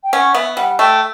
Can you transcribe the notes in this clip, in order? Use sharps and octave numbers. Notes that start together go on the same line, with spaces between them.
G5
C#4 F#5
B3 E5
G3 F#5
A3 G5